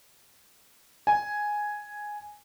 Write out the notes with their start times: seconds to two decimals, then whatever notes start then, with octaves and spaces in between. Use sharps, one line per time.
1.07 G#5